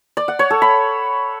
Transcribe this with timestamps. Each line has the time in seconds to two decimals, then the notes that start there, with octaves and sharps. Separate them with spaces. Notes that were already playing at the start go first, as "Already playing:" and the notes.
0.17 D5
0.28 F#5
0.39 C#5
0.50 A4
0.62 B5